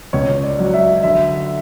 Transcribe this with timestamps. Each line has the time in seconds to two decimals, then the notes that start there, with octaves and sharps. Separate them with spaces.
0.13 C#2 C#5
0.43 D5
0.59 F#3
0.73 E5
1.03 D3 E5